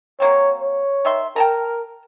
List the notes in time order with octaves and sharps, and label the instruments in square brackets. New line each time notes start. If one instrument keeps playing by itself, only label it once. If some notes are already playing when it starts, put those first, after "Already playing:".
[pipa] F#3 A#3 C4 [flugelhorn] C#5
[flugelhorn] C#5
[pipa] D#3 E5 C6
[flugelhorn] A#4 [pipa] G5 A5 A#5